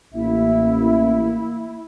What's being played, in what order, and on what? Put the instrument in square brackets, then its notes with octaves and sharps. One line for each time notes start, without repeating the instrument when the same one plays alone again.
[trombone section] A1 [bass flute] A#3 [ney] E4 [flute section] E5